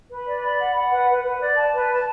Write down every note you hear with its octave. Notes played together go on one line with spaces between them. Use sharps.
B4
D5
B5
F#5
F#5
B4
B4
B4
D5
A5
B4
A5